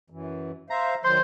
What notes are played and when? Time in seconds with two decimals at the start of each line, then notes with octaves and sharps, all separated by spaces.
0.10 F#2 E3
0.70 C5 E5 F5 A#5
1.04 D#3 F#3 C5 C6